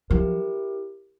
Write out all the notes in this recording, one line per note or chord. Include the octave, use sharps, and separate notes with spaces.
F3 E4 G4 A#4